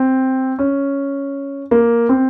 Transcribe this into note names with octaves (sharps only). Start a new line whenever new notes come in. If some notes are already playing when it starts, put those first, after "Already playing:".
Already playing: C4
C#4
A#3
C4